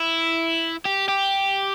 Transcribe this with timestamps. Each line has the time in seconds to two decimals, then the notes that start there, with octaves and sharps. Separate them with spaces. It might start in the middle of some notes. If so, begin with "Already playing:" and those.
Already playing: E4
0.85 G4
1.09 G4